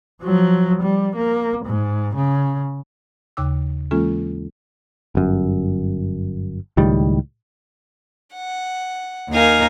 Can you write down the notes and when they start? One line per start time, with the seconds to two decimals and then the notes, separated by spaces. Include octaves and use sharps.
0.22 F3 F#3
0.82 G3
1.15 A#3
1.65 G#2
2.15 C#3
3.37 D#2 C#3 G5 D6 E6
3.91 E3 G#3 A#3 C#4 F4 A4
5.15 G1 F#2
6.77 C#2 A2 D#3 G3
8.35 F#5
9.30 D#2 D#4 A#4 F5 G#5 A#5